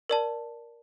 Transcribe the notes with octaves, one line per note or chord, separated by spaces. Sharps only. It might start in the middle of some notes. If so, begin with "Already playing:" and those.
A#4 D5 A5